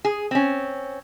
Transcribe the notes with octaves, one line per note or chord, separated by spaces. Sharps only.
G#4
C4 C#4